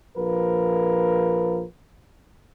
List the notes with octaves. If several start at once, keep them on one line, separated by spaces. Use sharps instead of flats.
A#1 F3 A#4 B4